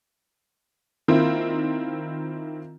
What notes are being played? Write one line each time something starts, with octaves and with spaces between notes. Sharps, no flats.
D#3 A#3 C4 E4 F4